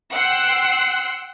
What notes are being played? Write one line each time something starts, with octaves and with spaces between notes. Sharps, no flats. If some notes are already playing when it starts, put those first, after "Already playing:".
F#5 G5 C6 E6 F#6 C7